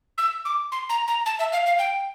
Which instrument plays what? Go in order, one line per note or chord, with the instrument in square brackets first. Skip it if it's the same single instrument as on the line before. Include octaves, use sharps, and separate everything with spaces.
[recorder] E6
D6
C6
A#5
A#5
A5
E5
F5
F5
G5